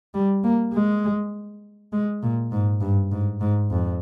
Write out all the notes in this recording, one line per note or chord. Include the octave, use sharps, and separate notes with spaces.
G3
A#3
G#3
G#3
A#2
G#2
G2
G#2
G#2
F2